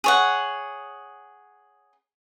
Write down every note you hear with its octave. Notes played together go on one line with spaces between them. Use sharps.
G#4 C#5 F#5